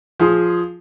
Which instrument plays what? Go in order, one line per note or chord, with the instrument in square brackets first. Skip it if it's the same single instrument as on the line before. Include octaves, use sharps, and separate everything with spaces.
[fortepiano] F3 G#4 C6